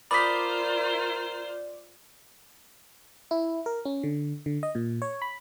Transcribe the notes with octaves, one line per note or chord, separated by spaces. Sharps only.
F4 A#4 C5 D5 B5 D#6 B6
E4
A#4
C#4
D3
D3
D#5
A#2
C#5
B5